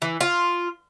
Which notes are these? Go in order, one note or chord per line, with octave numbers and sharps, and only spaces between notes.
E3
F4